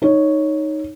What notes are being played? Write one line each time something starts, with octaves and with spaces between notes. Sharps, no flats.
D#4 C#5